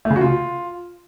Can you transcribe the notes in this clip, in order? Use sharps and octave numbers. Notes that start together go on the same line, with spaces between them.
A3
C#3
F#4
F4